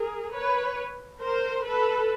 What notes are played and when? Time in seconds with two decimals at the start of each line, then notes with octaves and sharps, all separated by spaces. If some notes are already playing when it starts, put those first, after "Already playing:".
Already playing: G#4 A#4
0.33 B4 C#5
1.19 A#4 C5
1.63 A4 B4